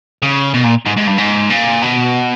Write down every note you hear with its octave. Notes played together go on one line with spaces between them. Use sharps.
C#3
B2
A#2
G#2
G#2
G2
G#2
A#2
B2